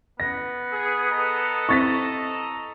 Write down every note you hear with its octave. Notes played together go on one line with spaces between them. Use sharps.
B3 A#6
G#4
A4 D#5 A#5
C4 E4 C#6 A6 B6